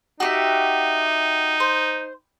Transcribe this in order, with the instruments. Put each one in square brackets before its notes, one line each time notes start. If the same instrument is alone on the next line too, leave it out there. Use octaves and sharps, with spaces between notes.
[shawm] D#4 [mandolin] F#4 G4 E5
[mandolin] C5